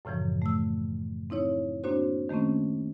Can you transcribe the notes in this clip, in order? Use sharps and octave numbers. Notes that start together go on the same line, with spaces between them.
F#2 A2 C#3 E3 F3
A3 E6
C4 D#4 E4 C#5
A#3 C4 D4 F#4 C5
D#3 A3 A#3 C4 C#4